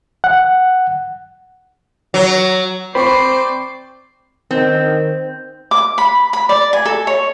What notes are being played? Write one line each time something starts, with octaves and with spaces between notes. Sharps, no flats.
F#5
F#3
C4 C5 D5 G5 B5 C#6 C7
D#3 C4
D6
B5
B5
D5
G#5
A4
C#5